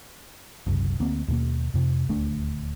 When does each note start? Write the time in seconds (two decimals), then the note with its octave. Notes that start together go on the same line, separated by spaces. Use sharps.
0.66 F#1 C2 F#2
1.00 D2 A#3 C4
1.28 D#2 B2 A#3
1.74 F2 C3
2.09 D#1 D2 A3 D4